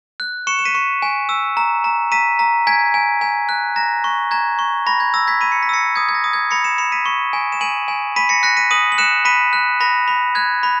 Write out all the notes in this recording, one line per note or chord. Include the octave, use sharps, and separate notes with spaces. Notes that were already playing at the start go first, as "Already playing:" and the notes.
F#6
C#6 C#7 E7
E7
B6 D#7
C#6
G#5
E6
A#5
A#5
A#5 B6 D#7
A#5
G#5 G#6 B6
G#5
G#5
F#6
A#5 A#6
C#6
A#5 G#6
C#6
B5 A#6
G#6
E6 A#6
G#6 B6
B5 D#7
C#7
B6
E6 A#6 C#7
D#6 G#6
G#6
A#6
D#6
G#6
B5 A#6 C#7
C#7 E7
B5 C#7 E7
B6 D#7
C#6
G#5
E7
G#5 D#7 F#7
G#5
B5 B6 D#7
A#6 C#7
F#6 A#6 C#7
B6 D#7
D#6 D#7 F#7
F#7
F#6 C#7 E7
B5 B6 D#7
F#6
B5 A#6
B5
F#6 G#6
B5